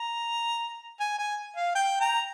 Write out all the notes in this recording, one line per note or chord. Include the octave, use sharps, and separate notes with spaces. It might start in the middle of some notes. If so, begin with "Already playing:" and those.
Already playing: A#5
G#5
G#5
F5
G5
G5 A#5